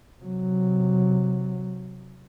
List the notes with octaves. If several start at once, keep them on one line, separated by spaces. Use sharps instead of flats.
C3 F#3